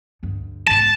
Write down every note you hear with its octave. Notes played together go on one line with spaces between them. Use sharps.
D2 G2
G1 G#2 A5